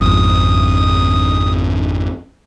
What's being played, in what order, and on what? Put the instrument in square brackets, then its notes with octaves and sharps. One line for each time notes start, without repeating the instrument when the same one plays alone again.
[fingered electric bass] G#1 F2 [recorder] D#6